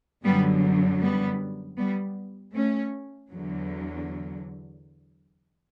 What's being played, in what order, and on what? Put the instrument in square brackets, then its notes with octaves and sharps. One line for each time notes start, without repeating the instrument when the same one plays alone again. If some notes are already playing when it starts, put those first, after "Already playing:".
[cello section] F#2 D3 F#3 G3 B3
G3 B3
G3 B3
A3 C#4
E2 D3 F#3